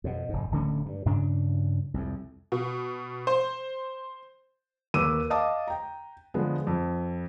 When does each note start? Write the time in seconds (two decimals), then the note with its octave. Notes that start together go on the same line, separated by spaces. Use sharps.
0.04 F2 B2
0.29 F1 G#2
0.51 D1 D3 A3 C#4
0.86 G2
1.05 G2 C#3 D4
1.94 C2 F2
2.52 B2
3.27 C5
4.94 D#2 A#4 B4 D6 E6 D#7
5.30 D#5 F5 A5 D6 D#6
5.67 G5 A#5
6.34 D3 F3 G#3 B3
6.67 F2